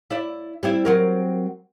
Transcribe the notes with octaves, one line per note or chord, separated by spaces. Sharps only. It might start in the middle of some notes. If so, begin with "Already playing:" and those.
E4 D5 E5
G3 C4 E4
F#3 C4 A#4